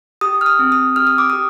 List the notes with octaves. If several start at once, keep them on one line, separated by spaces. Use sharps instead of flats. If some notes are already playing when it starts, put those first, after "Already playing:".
G4 D#6
F6
D#6
C4
D#6
G4 F6
D#6
D6
G4 D#6